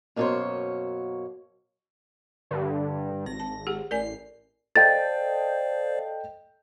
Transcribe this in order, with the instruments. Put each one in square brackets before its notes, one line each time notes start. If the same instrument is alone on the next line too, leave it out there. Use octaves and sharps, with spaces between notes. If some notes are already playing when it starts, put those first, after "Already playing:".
[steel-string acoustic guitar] F#2 B2 A#3 A4 C5 C#5
[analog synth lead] G2 [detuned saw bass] D3
[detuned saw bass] G#1 [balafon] C4 [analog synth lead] A#6
[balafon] A5
G4 G#4 F#5
[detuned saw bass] A1 [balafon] A#4 D5 G#5 [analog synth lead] C7
[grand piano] A4 D#5 G5 [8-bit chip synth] C5 D5 F5 [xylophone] A6